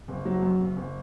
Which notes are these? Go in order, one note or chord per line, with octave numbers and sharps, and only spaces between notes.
F#1
F#3
F#2
F#1
F#1